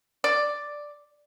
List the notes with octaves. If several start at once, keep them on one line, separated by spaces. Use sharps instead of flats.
D5